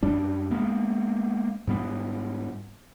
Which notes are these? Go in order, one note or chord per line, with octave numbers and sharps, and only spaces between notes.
F#2 G3 D4
G#3 A#3 B3
G#2 G3 B3